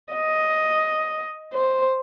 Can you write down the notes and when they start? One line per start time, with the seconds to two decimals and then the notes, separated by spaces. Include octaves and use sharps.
0.13 D#5
1.54 C5